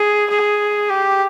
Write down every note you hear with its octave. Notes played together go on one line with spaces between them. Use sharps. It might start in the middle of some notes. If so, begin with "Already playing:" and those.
Already playing: G#4
G#4
G4